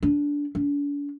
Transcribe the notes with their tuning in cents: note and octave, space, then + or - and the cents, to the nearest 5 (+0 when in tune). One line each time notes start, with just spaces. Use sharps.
D4 -15
D4 -40